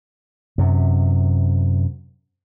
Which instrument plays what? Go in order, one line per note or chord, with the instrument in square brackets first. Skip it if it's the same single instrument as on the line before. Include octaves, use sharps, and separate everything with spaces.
[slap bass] F#2 C3